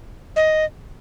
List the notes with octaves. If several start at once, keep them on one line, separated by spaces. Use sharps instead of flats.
D#5